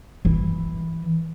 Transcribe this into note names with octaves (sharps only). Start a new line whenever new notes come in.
E3